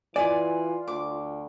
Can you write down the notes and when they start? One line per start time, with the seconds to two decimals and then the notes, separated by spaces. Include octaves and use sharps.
0.16 E3 F4 D5 G#5
0.88 D2 D6